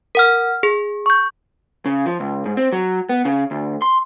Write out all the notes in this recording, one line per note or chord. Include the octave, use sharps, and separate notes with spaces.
A#4 F#5 F6
G#4
C#6 G6
C#3
F3
C#2
G#2
C4
F#3
B3
C#3
D2
C6